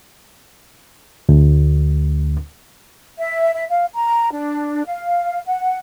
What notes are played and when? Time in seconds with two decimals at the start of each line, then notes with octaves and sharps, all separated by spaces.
1.29 D2
3.18 E5
3.55 E5
3.69 F5
3.94 A#5
4.32 D4
4.85 F5
5.46 F#5